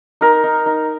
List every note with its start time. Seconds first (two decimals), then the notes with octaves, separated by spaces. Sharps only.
0.21 D#4 A#4
0.44 D#4
0.66 D#4